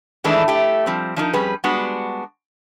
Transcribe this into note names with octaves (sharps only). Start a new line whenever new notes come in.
D#3 E3 G#3 A3 D4 E4
A3 G4
F3 G3 C4
F3 D4 D#4 A#4
F2 G3 C#4 G#4 B4
G3 G#3 B3 D4 F#4